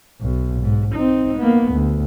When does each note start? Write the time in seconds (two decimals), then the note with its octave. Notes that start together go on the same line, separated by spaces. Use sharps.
0.21 B1 B2
0.60 G#2
0.95 C4 D#4
1.38 A#3 B3
1.72 D2